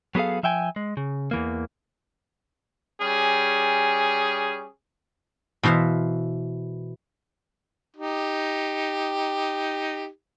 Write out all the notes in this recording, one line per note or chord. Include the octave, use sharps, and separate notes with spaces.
F#3 B3 G#4 A4 F5
F3 E5 G5 G#5
G#3
C#3
E2 E3 A#3
G3 C#4 G#4
B2 E3 C5 E5 F5
D#4 G4